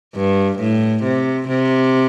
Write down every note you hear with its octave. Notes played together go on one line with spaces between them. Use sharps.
G2
A2
C3
C3